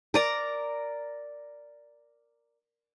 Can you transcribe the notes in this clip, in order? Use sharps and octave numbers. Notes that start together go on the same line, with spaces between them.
A#4 D5 A#5